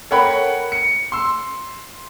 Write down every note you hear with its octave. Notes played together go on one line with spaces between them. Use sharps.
A4 A#4 C#5 F#5 G5 B5
C#7
C6 E6